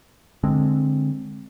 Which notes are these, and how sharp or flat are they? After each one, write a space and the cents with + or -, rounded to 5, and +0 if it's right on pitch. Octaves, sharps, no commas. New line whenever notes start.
D3 +0 G#3 +0 C4 +0